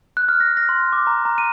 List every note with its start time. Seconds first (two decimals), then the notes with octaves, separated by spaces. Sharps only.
0.17 F#6
0.29 F6
0.40 A#6
0.57 A#6
0.69 C6
0.92 D6
1.07 A#5
1.25 A#5
1.38 D#7